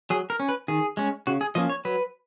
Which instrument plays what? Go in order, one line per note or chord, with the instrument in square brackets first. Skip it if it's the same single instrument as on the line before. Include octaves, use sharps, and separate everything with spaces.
[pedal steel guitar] F#3 G#4
A#4
C#4
B4
D#3 G#4
G#3 C#4
C#3 F#4
G#4
F3 A#3 C#4 D#5
C#5
F#3 B4